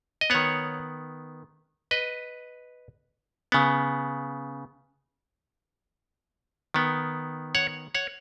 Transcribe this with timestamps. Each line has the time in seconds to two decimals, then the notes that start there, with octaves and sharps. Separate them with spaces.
0.21 D#5
0.30 D#3 B3 C#5 F#5
1.91 B4 D#5
3.52 C#3 B3
6.74 D#3 B3
7.55 C#5 F#5
7.95 C#5 F#5